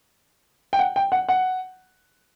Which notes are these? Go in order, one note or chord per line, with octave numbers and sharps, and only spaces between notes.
G5
F#5
G5
F#5
F#5